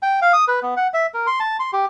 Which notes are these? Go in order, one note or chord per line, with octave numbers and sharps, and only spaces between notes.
G5
F5
D#6
B4
B3
F#5
E5
A#4
C6
A5
C6
G4